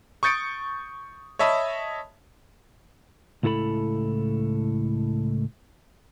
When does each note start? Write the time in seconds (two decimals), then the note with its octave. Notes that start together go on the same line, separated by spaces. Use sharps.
0.23 C#6 D#6 G6 A6 C#7 D7
1.39 C#5 D#5 E5 A5 B5 D#6
3.43 C#2 A2 E4 A4 B5